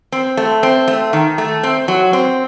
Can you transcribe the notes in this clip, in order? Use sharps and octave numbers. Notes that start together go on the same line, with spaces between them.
C4
A3
C4
A3
D#3
A3
C4
F#3
C4